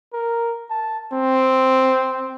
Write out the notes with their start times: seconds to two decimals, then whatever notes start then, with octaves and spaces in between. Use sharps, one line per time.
0.13 A#4
0.70 A5
1.13 C4